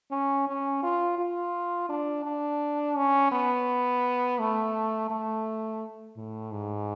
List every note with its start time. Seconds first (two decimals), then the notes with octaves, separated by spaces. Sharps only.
0.12 C#4
0.48 C#4
0.83 F4
1.18 F4
1.89 D4
2.25 D4
2.97 C#4
3.32 B3
4.39 A3
5.10 A3
6.17 A2
6.52 G#2